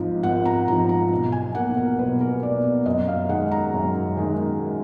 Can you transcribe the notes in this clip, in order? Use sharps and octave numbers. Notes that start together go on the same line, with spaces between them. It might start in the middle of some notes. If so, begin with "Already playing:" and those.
Already playing: G#1 G#2 F3
G#1 F#5
A#5
G#2 F3 A#5
A#5
B1
G#5
B2 A#3 F#5
A#4
B1 B4
A#4
B2 A#3 D5
D5
F#2 D#5
F5
D#3 G#3 F#5
A#5
F#2
D#3 G#3